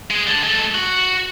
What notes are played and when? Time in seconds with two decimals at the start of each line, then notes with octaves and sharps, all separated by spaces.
0.11 G#3 G#4
0.27 D3 A5
0.43 G#3 A4
0.75 F#4